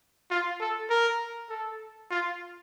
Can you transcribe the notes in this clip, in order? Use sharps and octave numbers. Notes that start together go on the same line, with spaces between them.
F4
A4
A#4
A4
F4